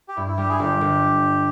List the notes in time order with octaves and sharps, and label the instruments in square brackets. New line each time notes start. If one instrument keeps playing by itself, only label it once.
[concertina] G4
[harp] G2 [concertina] E4
[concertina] E4
[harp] G3 [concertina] G4
[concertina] E4 G#4
[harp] G1 [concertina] G4
[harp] G1